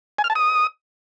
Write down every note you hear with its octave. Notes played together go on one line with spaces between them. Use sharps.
G#5
F6
A5
D#6